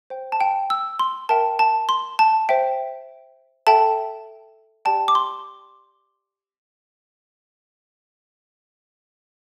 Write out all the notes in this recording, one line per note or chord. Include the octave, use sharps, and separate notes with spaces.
C5 G5
A5
G5
E6
C6
A#4 E5 G5 A5
A5
C6
A5
C5 E5 G5
A4 E5 G5 A5
G4 D5 G5 A5
D6
C6